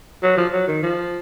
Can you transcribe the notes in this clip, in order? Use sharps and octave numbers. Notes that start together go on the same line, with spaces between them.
F#3
F3
F#3
D#3
F3